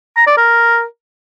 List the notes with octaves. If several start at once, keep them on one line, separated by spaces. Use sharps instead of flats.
A#5
D5
A#4